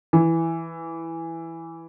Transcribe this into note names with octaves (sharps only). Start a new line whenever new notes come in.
E3